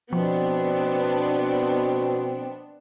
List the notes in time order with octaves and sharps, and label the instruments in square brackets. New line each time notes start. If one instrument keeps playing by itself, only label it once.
[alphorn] B2 [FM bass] F3 [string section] B3 D4 [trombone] C4